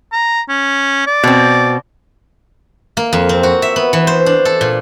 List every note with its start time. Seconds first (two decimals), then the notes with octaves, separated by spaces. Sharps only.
0.13 A#5
0.49 C#4
1.07 D5
1.23 B2 C4
2.97 A#3
3.13 F2
3.29 C4
3.43 F#4
3.62 E5
3.76 B3
3.93 E3
4.07 C5
4.26 D4
4.45 A4
4.61 A#2